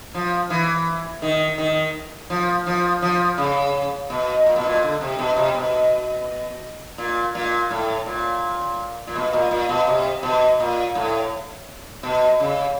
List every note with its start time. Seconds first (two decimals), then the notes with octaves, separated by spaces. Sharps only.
0.14 F3
0.50 E3
1.22 D#3
1.58 D#3
2.30 F3
2.66 F3
3.02 F3
3.38 C#3
4.10 B2
4.46 A#2
4.56 B2
4.66 A#2
4.83 D3
5.01 C3
5.19 B2
5.36 C3
5.55 B2
6.98 A#2
7.35 A#2
7.70 A2
8.06 A#2
9.07 A#2
9.16 B2
9.33 A#2
9.51 A#2
9.69 B2
9.87 C3
10.23 B2
10.60 A#2
10.95 A2
12.03 B2
12.40 C#3